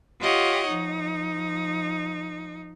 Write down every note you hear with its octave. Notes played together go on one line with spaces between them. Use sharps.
F4 G4 C#5 D#5 F#5
F3 D#4